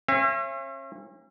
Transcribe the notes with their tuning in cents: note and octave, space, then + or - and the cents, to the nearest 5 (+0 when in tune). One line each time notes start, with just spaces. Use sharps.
C#4 -40 E5 +40